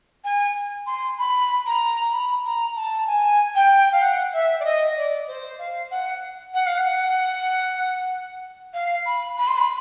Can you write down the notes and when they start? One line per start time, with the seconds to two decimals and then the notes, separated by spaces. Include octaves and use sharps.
0.24 G#5
0.87 C6
1.18 B5
1.66 A#5
2.01 A#5
2.13 B5
2.45 A#5
2.76 A5
3.07 G#5
3.55 G5
3.92 F5
4.02 F#5
4.33 E5
4.60 D5
4.65 D#5
4.97 D5
5.28 C5
5.59 F5
5.91 F#5
6.54 F#5
6.67 F5
6.78 F#5
8.74 F5
9.06 B5
9.37 B5
9.48 C6
9.58 B5